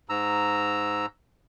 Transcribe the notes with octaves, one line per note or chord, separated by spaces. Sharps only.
G#2 A#5 E6